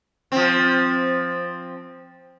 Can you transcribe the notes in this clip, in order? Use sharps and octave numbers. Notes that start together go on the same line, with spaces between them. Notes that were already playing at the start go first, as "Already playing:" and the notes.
F3 C4